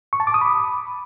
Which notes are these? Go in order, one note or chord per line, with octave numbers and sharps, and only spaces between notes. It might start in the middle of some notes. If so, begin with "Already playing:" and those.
C#6
A5
D6
D#6
B5